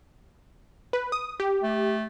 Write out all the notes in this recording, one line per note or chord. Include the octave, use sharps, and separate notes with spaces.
B4
D#6
G4
A3